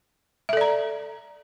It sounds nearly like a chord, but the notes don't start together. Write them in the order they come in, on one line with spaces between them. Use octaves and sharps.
E5 A4 D5 A#5